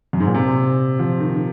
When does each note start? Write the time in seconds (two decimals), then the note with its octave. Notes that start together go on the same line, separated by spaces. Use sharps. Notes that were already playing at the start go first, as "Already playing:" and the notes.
0.13 F#2
0.20 G#2
0.27 A#2
0.35 C3
0.99 F3
1.20 D#3
1.35 D#3